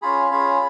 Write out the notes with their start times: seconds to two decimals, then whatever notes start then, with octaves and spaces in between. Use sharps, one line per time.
0.02 C#4 F4 G#4 B5
0.31 C#4 F4 G#4 B5